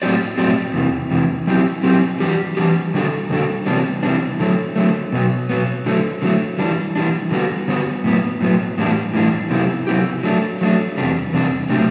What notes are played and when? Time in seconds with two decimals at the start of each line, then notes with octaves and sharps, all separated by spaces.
0.02 A2 F#3 C4 G4 D5
0.38 A2 F#3 C4 G4 D5
0.74 E2 C3 E3
1.11 E2 C3 E3
1.47 F#3 C4 E4 G4
1.84 F#3 C4 E4 G4
2.20 E3 G3 D4 G4
2.57 E3 G3 D4 G4
2.94 D3 G3 D4 F#4 A4
3.30 D3 G3 D4 F#4 A4
3.66 C3 E3 G3 B3 D4
4.03 C3 E3 G3 B3 D4
4.40 D3 F#3 A3
4.76 D3 F#3 A3
5.13 B2 F#3 B3
5.50 B2 F#3 B3
5.86 D3 F#3 A3
6.22 D3 F#3 A3
6.59 E3 G3 D4
6.95 E3 G3 D4
7.31 D3 G3 B3 F#4
7.68 D3 G3 B3 F#4
8.04 A2 F#3 B3
8.41 A2 F#3 B3
8.78 A2 E3 G3 D4
9.14 A2 E3 G3 D4
9.50 C3 F#3 B3 E4 G4
9.87 C3 F#3 B3 E4 G4
10.24 F#3 A3 D4
10.61 F#3 A3 D4
10.98 E2 C3 G3 D4
11.33 E2 C3 G3 D4
11.70 C3 F#3 A3 D4 G4